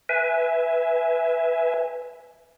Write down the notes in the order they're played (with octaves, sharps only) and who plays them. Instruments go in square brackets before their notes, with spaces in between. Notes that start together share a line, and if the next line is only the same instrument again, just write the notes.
[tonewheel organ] B4 E5 G#5